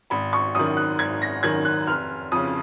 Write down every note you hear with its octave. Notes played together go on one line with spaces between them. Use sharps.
G#1 B5
C#6
F#2 D#3 D#6
F#6
G#1 G#6
A#6
F#2 D#3 G#6
F#6
F1 F6
F2 C#3 D#6